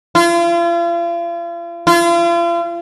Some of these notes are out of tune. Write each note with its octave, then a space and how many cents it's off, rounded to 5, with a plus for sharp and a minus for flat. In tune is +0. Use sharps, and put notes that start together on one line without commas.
F4 -40
F4 -40